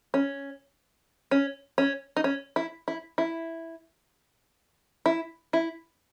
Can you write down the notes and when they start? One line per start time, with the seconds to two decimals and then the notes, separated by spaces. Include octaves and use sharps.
0.14 C#4
1.31 C#4
1.78 C#4
2.16 D#4
2.24 C#4
2.56 E4
2.88 E4
3.18 E4
5.06 E4
5.53 E4